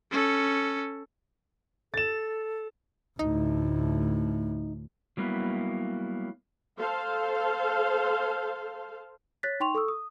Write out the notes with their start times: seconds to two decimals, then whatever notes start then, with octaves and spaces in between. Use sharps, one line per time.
0.11 C#4 A4
1.94 A4 A6 E7
3.19 D2 A2 D#4
5.17 F#3 G3 A#3 B3 E4
6.78 A4 C5 F5
9.43 C#5 F#6 A6 B6
9.60 D#4 G5 C6 C#6 F7
9.75 A4 C#6 D#6 E6
9.88 D#6